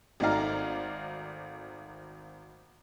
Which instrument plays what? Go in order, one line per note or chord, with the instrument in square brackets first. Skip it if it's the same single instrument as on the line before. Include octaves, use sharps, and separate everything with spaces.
[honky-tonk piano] G#1 A3 D#4 D5 F5 A#5